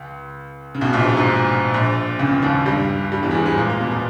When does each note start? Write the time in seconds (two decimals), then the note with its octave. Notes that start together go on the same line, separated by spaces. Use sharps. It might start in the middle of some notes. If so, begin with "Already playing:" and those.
Already playing: C#2
0.75 C#3
0.81 B1 B2
0.93 A#1 A#2
1.04 G#2
1.17 G#2
1.74 A#1 A#2
2.19 C#2 C#3
2.42 D#2 D#3
2.66 G2 G3
3.12 G2 G3
3.23 E2 E3
3.31 G#3
3.34 G2 G3
3.46 G#2 G#3
3.57 A#2 A#3
3.69 A#2 A#3
3.81 B2 B3
3.91 A#2 A#3